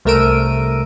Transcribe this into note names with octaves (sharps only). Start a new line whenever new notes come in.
C2 A3 A#4 E6 D7 D#7